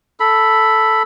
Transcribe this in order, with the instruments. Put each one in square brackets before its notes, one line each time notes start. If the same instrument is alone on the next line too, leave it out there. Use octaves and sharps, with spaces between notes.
[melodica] A4 B5